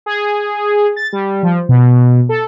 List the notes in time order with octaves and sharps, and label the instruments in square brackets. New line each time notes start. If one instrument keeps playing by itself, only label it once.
[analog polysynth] G#4
A6
G3
F3
B2
A4